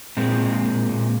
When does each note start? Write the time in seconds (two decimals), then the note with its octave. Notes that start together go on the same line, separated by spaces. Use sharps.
0.17 A#2 G#3 C4
0.41 A#2
0.65 A#2
0.89 A#2